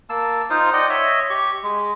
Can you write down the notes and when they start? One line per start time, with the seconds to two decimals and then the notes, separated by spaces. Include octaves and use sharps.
0.10 A#3 A5 E6
0.50 D#4 F4 C5
0.73 D5 D#5 F#5 G5
0.90 C#5 D#5 E5
1.30 G4 C#6
1.63 G#3